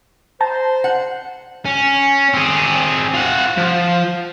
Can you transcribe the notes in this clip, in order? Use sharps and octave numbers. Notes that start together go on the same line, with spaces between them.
C5 A5 A#5
F#5
C#4
C4 G#4
F4 F#5
F3